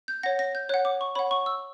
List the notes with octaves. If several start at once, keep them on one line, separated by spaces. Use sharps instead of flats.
G6
C#5 F#5 A#6
A#6
G6
C#5 F#5 F#6
D6
C#6
C#5 F#5 B5
C#6
E6